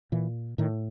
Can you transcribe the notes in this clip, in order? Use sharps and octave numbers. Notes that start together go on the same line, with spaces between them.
A#2 E3
A2 D#3